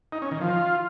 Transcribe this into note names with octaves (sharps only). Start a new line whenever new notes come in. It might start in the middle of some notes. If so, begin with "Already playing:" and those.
D#4
C#4
D#3
F3
F4